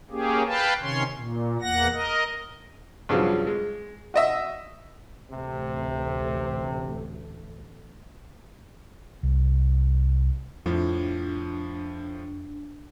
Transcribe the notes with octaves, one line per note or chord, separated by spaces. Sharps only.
A#3 C#4 G4 G#4
B4 F5 G5 A5
C3 D#3 C#4 C#5 C6
A#2
E2 A#3 F#5 A#6
A#4 D#5
G2 C#3 F3 F#3
G#3
F#4 D#5 E5
A1 D2 C3 A3
C2
F2 A2 F3 D4